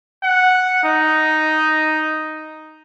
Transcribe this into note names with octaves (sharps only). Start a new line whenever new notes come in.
F#5
D#4